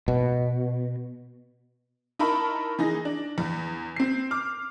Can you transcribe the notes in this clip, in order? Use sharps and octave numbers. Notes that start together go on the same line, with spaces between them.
B2
D#4 E4 A#4 A5 B5 C#6
E3 D#4 G#4 A#6
D4
E2
C4 C7
D6 F6